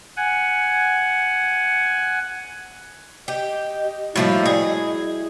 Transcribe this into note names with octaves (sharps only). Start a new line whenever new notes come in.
F#5 G#5
G4 D#5
A2 F3 G3 A#3 E4 F#4 B5
F#4 G#4 D5 G5